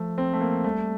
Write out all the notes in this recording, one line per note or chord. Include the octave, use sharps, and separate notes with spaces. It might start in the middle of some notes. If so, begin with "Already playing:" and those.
Already playing: F3 A3
C4
A3
A#3
G3 A3